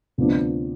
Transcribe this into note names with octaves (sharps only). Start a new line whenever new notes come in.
D2 C3 F3 B3 D4